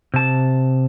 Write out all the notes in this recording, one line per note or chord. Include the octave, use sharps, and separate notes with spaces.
C3 A5